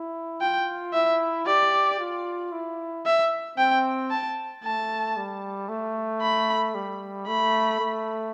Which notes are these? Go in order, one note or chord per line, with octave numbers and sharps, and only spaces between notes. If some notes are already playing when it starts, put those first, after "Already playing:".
Already playing: E4
F4 G5
E4 E5
G4 D5
F4
E4
E5
C4 G5
A5
A3 A5
G3
A3
B5
G3
A3 B5
A3